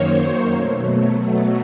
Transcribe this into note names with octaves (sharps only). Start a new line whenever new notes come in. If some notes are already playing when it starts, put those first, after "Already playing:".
Already playing: F#2 D#3 F#3 A#3 C5 C#5
B2 F#3 A3